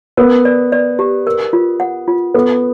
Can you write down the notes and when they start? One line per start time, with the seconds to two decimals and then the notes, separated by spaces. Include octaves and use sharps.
0.17 B3 A#4
0.45 D5
0.72 D5
0.99 G4
1.27 A#4
1.53 F4
1.80 F#5
2.08 F4
2.34 B3 A4